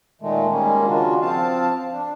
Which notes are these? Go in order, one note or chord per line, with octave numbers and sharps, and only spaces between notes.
A#2 D#3 G#3 A3
D#3 G3 G#3 A#3 C#4
C#3 D4 F4 F#4
F3 C4 F5 A5
D4